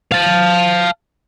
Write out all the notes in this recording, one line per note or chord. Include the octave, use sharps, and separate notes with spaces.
F5 A5